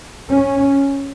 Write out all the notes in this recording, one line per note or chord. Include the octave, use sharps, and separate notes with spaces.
C#4